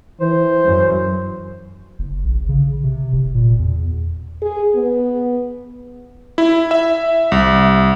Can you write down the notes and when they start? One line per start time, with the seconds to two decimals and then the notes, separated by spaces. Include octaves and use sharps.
0.21 E3 C5
0.64 F#2
1.99 F#1
2.25 A#1
2.49 C#3
2.83 C3
3.13 F#1
3.35 A#2
3.59 E2
4.42 G#4
4.75 B3
6.38 E4
6.71 E5
7.32 C2